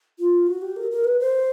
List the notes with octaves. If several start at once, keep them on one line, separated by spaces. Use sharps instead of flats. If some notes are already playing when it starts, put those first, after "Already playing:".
F4
F#4
G4
A#4
A#4
B4
C5